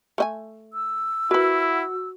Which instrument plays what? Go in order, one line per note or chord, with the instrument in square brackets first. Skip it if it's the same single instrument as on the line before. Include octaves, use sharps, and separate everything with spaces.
[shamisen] A3 D#5 G#5
[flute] E6
[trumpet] E4 [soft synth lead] F#4 [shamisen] A#4 B4